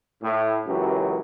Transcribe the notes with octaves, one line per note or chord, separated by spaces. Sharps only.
A2
C#2 F#2 E3 F#3 G4